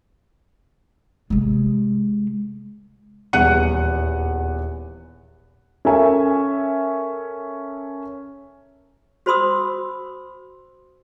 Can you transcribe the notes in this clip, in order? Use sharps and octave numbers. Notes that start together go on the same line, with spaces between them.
C3 G#3
D#1 E2 F#5 F#6 C#7 D#7
C#4 A4 A#4 E5 G#5
F#4 C5 B5 C6 D#6 E6